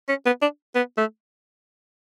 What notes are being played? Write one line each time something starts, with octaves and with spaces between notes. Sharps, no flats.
C#4
B3
D4
B3
A3